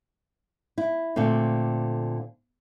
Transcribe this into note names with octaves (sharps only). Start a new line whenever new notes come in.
E4
A#2 D3 A3 C4